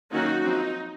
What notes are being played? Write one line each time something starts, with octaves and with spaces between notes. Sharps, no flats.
D#3 F#3 A#3 C#4 D#4 F#4
F3 C4 D#4